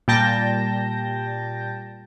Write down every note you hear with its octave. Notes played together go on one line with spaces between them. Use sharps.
A#2 G3 G5 A5 G6 A#6